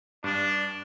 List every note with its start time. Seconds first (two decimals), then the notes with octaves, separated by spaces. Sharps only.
0.24 G2 D4